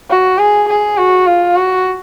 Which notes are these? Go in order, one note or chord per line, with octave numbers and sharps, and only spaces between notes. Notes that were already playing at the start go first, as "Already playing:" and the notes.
F#4
G#4
G#4
F#4
F4
F#4